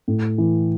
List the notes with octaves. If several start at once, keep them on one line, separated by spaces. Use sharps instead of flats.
A2
E3